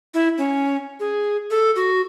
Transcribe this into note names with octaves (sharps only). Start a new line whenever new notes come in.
E4
C#4
G#4
A4
F#4